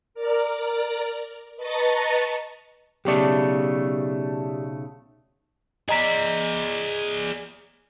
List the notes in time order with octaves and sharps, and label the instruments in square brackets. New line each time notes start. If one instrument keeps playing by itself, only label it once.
[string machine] A#4 D5 A#5
B4 D#5 A5 A#5 C#6 A6
[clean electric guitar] B1 C#3 A3 [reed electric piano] G4 D5
[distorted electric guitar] G#4 D5 [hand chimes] D#5 A#5 B6